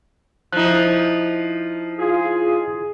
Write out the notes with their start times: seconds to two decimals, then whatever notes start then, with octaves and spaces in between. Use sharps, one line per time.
0.52 F3 D#4 E4 F#6
1.99 F4 G#4